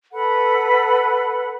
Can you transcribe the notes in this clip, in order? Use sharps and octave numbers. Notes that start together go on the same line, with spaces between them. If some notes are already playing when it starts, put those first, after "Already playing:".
A4 B4 F#5 B5